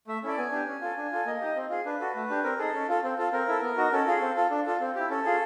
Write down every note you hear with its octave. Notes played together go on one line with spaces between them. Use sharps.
A3 E5
C#4 E4 A4 D5
B3 G#5
D4 G4
C#4
F4 A4
D4
F4 A4
A#3 D#5
D#4 G4
C4
F4 G#4
D4 B4
F#4 A4
A3
D4 G4
C4 A#4
D#4 G#4 A4
C#4
F4 A4
C4
F4 A4
C4 A#4
E4 A4
B3
D#4 F#4
C#4 A4
F4 G#4
C4
F4 A4
D4
F4 A4
C4
E4 G4
C#4 A4
F4 G#4